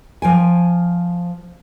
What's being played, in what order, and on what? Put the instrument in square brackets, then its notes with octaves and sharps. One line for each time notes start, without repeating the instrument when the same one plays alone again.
[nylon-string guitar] F3 G5 G#5